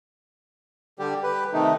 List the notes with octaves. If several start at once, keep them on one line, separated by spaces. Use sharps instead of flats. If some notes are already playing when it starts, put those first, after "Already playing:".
D3 G3 G4
G4 B4
C3 D#3 A3 D#4